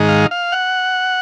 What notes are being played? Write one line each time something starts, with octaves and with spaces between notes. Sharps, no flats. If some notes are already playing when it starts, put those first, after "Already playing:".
Already playing: G#2 D#3 G#3 D#4
F5
F5
F#5